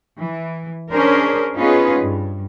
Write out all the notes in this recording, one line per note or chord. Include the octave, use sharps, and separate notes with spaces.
E3
C#4 D4 G#4 A#4 C5
B3 C#4 D#4 F4 G#4 B4
G2